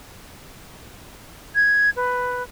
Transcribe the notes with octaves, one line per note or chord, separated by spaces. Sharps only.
G#6
B4